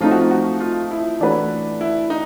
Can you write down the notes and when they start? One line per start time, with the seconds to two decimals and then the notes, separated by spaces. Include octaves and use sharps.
0.01 F3 A3 C4 D#4 F4
0.11 F#4
0.21 F4
0.31 F#4
0.60 F4
0.91 E4
1.20 E3 A3 D4 F#4 B4
1.81 E4
2.10 D#4